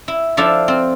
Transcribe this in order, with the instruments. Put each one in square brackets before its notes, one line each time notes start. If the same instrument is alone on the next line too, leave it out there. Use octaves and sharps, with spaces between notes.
[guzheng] E4
F3 D4 E4 A4 F5
C4 F4